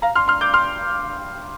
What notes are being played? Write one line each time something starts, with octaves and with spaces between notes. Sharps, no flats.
F5 A#5
C6 F6
C6 F6
D6 G6
C6 F6